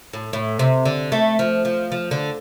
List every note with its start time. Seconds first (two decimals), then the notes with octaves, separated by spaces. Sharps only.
0.13 A2
0.33 A2
0.59 C3
0.85 D3
1.12 A3
1.39 F3
1.65 F3
1.92 F3
2.11 D3